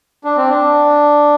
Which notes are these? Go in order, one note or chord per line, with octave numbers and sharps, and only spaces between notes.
D4
C4
D4